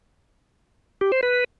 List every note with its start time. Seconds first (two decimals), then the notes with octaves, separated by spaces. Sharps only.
1.01 G4
1.12 C5
1.23 B4